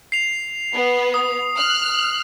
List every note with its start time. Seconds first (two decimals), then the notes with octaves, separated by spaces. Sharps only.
0.12 C7 F7
0.74 B3
1.14 D#6
1.58 F6 F#6